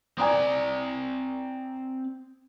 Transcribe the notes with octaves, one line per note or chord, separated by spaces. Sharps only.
C4 D5 G#5 A#5 D#6